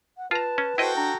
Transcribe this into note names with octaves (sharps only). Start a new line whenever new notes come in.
F#5
F4 B4 A5 A#5
C#4
E4 F#4 A4 C5 D#5 G5
D4 A#5